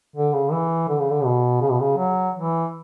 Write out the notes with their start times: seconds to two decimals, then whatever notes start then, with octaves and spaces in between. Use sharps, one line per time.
0.16 D3
0.33 C#3
0.52 E3
0.89 D3
0.99 C#3
1.10 D3
1.24 B2
1.62 C#3
1.70 B2
1.80 C#3
1.97 F#3
2.35 E3